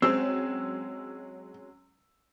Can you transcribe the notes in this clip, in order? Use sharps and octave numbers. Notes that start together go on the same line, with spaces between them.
F#3 G#3 C4 C#4 E6